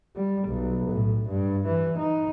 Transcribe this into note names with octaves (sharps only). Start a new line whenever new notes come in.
G3
B1
A2
G2
E3
D#4